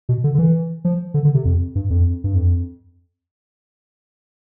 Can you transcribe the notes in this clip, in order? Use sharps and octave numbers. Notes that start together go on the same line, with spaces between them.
B2
D3
D3
E3
F3
D3
D3
C3
F2
G2
F2
G2
F2